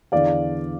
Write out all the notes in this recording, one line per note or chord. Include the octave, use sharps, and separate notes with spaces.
E2 D3 D5 F5